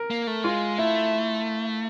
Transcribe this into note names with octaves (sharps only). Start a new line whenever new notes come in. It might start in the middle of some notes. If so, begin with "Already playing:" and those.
Already playing: A#4
A#3
A3
G#3 F4
A3 E4